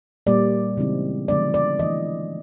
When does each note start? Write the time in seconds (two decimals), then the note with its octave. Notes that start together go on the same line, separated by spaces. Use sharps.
0.27 A#2 G3 A#3 D5
0.77 C#3 E3 G#3 C4 D#4
1.28 D3 F3 G#3 B3 D4 D5
1.54 D5
1.79 E3 A3 D4 D#5